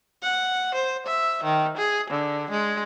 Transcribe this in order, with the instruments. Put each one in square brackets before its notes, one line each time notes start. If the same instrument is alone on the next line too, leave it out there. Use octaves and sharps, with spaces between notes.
[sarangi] F#5
C5
E5
D#3
G#4
D3
G#3